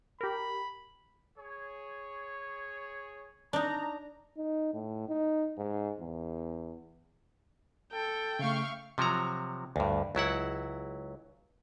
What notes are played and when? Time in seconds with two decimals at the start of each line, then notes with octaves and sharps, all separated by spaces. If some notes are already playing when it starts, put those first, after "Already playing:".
0.21 G4 A#4 B5
1.37 G#4 C#5
3.53 D4 D#4 A#5
4.37 D#4
4.73 A2
5.09 D#4
5.57 G#2
6.00 E2
7.92 A4 G5
8.39 C#3 A3 E5 F5 C#6
8.98 C3 F3 F#3 F#4 A#5
9.76 D2 G2
10.15 C#2 F#3 E4 F#5